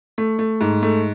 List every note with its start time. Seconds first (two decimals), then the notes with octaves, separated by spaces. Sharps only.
0.18 A3
0.39 A3
0.61 G#2
0.83 A3